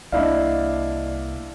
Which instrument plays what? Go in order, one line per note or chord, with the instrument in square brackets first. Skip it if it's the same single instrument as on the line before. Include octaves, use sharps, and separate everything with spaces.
[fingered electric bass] C2 A#3 [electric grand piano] D4 E4 F5 [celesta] D5 D#5